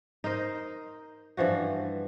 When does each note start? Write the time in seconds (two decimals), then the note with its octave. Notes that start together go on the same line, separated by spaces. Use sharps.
0.24 D#4 A#4 C5 D#5
1.37 G2 E3 F3 F#4